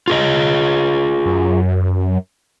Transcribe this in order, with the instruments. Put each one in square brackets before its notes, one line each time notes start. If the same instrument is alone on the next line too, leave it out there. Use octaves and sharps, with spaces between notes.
[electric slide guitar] F4 G#4 D#5
[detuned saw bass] F#2